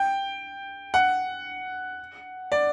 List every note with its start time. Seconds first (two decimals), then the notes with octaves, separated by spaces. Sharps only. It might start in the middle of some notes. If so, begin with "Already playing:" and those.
Already playing: G5
0.94 F#5
2.52 D5